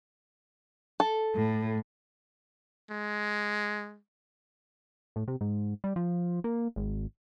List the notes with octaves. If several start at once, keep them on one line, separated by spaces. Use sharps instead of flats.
A4
A2
G#3
A2
C3
G#2
G3
F3
A#3
G#1